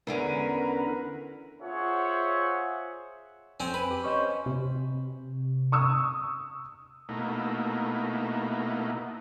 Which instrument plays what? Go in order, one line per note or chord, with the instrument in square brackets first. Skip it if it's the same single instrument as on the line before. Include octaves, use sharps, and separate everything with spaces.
[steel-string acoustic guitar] E2 D3 C#4 [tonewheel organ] A#4 B4
[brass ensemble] F4 G#4 C5 C#5 E5 F#5
[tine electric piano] F2 [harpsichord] C4 C#4 [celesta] G#5
[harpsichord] B4 [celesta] B5
[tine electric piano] G4
[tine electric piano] C#4 C5 [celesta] D#5 C#6
[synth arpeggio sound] C3
[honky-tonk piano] C#6 D#6 E6
[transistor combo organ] B2 A3 A#3 D#4 E4